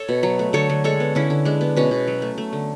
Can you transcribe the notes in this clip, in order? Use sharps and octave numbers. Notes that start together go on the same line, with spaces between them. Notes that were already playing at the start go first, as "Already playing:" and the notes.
Already playing: A4 C#5
B2
F#3
A3
D3 A4 C#5
D3
G#3 A4 C#5
B3
D3 C#4 E4
D3
G#3 D4
B3
B2 C#4
B2
F#3
A3
A3
D3